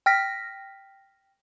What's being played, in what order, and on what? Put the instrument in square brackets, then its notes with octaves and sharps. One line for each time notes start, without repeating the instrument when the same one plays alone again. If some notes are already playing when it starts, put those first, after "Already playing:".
[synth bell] G5 F6 A#6 B6